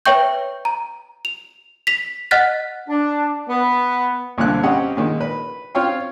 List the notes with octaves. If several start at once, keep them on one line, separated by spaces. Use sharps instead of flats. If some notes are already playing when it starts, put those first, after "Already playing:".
B4 C#5 E5 G5 C#6 G6
A#5
F7
B6 F7
D#5 F#5 F6 F#6 A6 B6
D4
B3
C2 A#2 D3 C4 F5 F#6
C4 C#4 G4 D#5 F5 F#5
A#2 D#3 G#3
B4
C4 F4 C#5 F5 G5